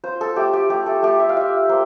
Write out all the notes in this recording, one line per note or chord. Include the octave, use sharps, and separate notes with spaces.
F4 C5
A4
A3 G4
G4
A3 G4
A4
A3 G4
E5
F5
F4 E5
A#3 C5